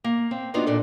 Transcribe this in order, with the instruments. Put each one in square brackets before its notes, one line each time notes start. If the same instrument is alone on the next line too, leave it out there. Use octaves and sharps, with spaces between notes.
[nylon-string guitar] A#3
C4
A#3 B3 D4 D#4 F4 F#4
A#2 D4 A4